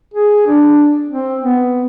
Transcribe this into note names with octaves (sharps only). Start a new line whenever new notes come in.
G#4
D4
C4
B3